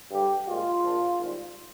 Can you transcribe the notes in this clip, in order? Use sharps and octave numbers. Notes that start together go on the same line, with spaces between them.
G2 D3 G3 G4
A#1 A#2 G#3 F4
A#1 A#2 F3
G#1 G#2 G3